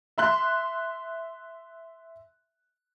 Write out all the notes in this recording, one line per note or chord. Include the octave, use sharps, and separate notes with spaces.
E5 C6 F#6